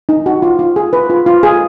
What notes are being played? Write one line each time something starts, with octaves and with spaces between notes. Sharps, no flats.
D#4
F#4
F4
F4
G#4
B4
F4
F4
G#4